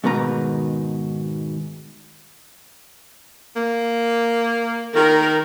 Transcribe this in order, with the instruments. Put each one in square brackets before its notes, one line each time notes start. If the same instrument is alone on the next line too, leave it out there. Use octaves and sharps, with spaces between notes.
[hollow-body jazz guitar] G#2 B2 D#3 B4 A#5
[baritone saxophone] A#3
[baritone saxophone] D#3 [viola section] A#4